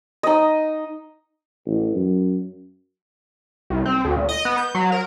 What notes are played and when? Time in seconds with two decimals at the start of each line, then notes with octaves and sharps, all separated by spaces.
0.23 D#4 D#5
1.66 A1
1.95 F#2
3.70 C2
3.85 C4
4.05 D2
4.17 A#2
4.29 D#5
4.45 B3
4.57 G6
4.75 F#3
4.92 A#4